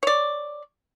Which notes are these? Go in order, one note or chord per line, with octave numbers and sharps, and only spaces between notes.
C#5 D5